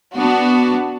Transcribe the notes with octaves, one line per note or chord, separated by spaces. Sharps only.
B3 D4 F#4